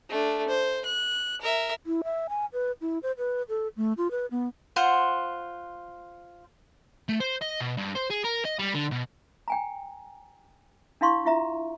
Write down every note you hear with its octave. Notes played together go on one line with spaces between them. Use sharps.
A3 D4
C5
F#6
A#4 E5
E4
E5
G#5
B4
E4
C5
B4
A4
A3
F4
B4
B3
F4 C5 F#5
A3
C5
D#5
B2
G2
C5
G#4
A#4
D#5
G3
D3
B2
G5 G#5 A#5
D4 E4 F5 C6 C#6
E4 F4 E5 A#5